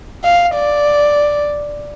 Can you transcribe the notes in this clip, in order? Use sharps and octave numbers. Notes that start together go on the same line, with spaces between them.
F5
D5